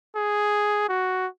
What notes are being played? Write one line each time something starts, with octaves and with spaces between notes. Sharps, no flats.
G#4
F#4